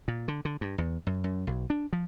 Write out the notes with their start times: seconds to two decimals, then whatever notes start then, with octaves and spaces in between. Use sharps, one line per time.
0.08 A#2
0.28 D3
0.45 D3
0.61 G2
0.78 E2
1.07 F#2
1.24 F#2
1.47 B1
1.70 D4
1.93 F3